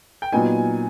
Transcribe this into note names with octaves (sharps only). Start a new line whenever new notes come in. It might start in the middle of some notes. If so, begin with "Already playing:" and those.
G5
A#2 F#3 B3 D#4 G#5